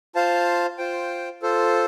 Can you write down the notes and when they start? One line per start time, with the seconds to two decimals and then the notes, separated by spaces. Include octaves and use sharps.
0.15 F4 C5 F5 A5
0.78 F4 C5 G5
1.42 F4 A4 C5